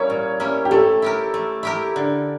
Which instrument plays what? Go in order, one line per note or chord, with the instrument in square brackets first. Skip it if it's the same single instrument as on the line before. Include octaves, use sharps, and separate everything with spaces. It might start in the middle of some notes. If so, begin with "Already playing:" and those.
Already playing: [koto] G3 A#3 C#4 E4 [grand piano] C#5
[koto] A#2
G3 A#3 C#4 E4
[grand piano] G4
[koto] A3 [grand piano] A4
[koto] E4 G4 A#4
A3
E4 G4 A#4
D3